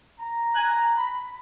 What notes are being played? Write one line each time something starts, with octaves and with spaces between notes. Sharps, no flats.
A#5
G#5 F#6
B5